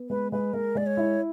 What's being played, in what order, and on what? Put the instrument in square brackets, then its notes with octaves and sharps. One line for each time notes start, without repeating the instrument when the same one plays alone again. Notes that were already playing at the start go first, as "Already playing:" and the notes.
Already playing: [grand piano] B3
[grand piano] G#3 [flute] B4
[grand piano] G#3 [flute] B4
[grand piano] G#3 [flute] A#4
[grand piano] G#3 [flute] D5
[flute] C#5
[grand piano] E4